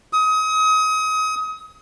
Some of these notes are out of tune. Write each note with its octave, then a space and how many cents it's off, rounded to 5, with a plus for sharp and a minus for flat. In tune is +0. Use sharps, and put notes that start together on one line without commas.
D#6 +30